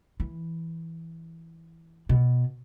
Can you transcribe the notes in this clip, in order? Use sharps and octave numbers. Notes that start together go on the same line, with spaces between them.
E3
B2